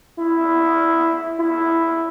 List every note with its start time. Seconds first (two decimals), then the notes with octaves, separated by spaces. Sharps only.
0.19 E4
1.40 E4